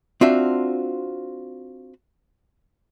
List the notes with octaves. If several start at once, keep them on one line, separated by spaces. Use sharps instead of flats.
C4 D4 F4 F#4 E5